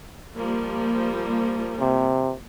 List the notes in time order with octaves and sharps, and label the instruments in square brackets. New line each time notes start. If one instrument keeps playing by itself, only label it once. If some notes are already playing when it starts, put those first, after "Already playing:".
[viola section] F3 G3 A#3
[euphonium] C3